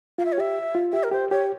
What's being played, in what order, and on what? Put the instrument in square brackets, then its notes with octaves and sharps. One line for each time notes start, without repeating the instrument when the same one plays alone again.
[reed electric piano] F4 [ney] F5
[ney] E5
C#5
[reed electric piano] G4 [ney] E5
[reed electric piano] F4
[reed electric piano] G4 [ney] E5
[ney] A#4
[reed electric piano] G4 [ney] C5
[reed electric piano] G4 [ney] C#5